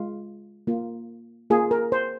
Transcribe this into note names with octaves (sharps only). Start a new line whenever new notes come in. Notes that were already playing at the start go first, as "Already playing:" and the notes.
Already playing: G#3 F4
A#3 F4
A#3 F4 G#4
A#4
C5